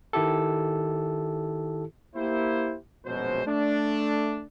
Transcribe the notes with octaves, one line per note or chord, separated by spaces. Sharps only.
D#3 E4 G4 A4
A#3 E4 G4 C5
A#1 F#2 B2 F#3 G#3 C5
A3 D4